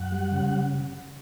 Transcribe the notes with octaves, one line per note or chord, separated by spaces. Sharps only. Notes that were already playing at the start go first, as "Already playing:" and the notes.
Already playing: F#2 F#5
G3
C#3